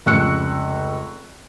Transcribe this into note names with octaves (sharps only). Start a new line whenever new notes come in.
F1 C#2 C#6 E6 F#6 C#7